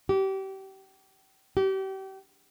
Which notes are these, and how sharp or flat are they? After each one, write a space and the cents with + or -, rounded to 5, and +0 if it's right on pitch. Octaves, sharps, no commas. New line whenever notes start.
G4 -30
G4 -35